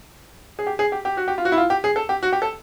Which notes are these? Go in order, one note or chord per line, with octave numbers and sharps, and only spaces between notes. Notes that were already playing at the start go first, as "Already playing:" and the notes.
G#4
G4
G#4
G4
G4
F#4
G4
F4
F#4
E4
F4
G4
G#4
A4
G4
F#4
G4
A4